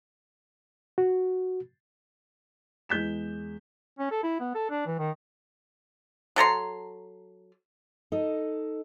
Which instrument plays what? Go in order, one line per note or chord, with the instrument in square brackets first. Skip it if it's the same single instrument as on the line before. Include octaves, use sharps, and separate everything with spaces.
[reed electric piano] F#4
[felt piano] E2 G#3 G6 B6 E7
[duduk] C#4
A4
E4
B3
A4
D4
E3
D#3
[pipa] F#3 A4 A#5 C6
[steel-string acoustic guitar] D#4 A4 D#5